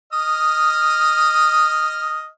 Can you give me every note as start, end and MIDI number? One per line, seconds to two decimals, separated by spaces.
0.13 2.27 75
0.13 2.27 87
0.13 2.27 89